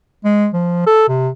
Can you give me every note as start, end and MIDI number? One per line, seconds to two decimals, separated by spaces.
0.25 0.48 56
0.54 0.85 53
0.86 1.05 69
1.08 1.29 48